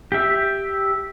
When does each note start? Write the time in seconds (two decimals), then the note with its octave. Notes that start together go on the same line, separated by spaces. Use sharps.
0.12 G4 E5